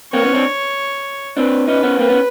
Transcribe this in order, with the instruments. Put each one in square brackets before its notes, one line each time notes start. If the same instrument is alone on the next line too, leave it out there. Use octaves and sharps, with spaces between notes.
[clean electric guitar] A#3 C4 [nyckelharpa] C#5
[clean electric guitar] B3 C#4
C4 D4
[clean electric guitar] C4 D4 [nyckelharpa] B4
[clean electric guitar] C#4 D#4 [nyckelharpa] B4
[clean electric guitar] B3 C#4
[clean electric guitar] A#3 C4 [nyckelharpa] B4
[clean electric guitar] B3 C#4